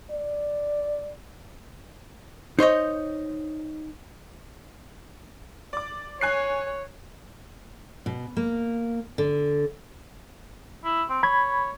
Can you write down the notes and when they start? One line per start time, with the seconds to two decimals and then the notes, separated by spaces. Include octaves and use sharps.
0.11 D5
2.59 D#4 C5 C#5 D#5
5.73 D5 D6
6.21 C#5 G#5 F#6 C7
8.06 B2
8.37 A#3
9.18 D3
10.84 E4
11.10 C4
11.23 C#5 B5 G#6